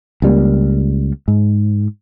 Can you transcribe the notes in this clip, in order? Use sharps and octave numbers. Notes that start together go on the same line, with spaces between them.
C#2 G3 A#3
G#2